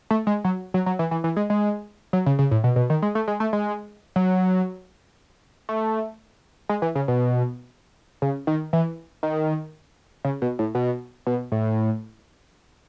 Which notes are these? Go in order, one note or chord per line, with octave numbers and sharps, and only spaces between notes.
A3
G#3
F#3
F#3
F#3
E3
E3
E3
G#3
G#3
F#3
C#3
C#3
A2
B2
B2
D#3
G#3
A3
G#3
A3
G#3
F#3
A3
G#3
E3
C#3
B2
C#3
D#3
E3
D#3
C#3
B2
A2
B2
B2
A2